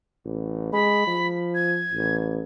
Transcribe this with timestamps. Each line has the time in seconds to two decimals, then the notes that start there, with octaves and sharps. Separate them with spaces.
0.25 A1
0.73 G#3 B5
1.07 F3
1.55 G#6
1.92 A1